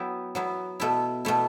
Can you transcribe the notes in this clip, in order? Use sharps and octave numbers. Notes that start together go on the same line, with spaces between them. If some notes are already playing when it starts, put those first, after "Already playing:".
Already playing: F#3 B3 E4 G5
F#3 B3 E4
B2 A3 E4
B2 A3 E4